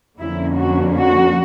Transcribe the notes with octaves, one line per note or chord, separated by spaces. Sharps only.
F2 D3 F3 A#3 C#4 E4
F#4
F#4